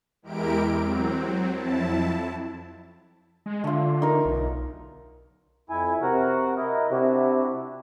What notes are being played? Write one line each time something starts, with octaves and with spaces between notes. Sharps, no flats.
E2 G#3 E4 G4 A#4 D7
F#3 C4
F2 E4 A5
G#3
D3 A3 F4
D#4 A#4
B1
F2 E4 G#5
C3 F#4 A#4 F#5
E4 A#4 D#5
C3 D4 E4 F#4